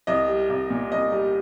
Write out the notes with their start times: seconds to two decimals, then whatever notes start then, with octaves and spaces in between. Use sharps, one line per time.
0.07 C2 D#5
0.28 G3
0.49 C2
0.70 A#2
0.92 C2 D#5
1.12 G3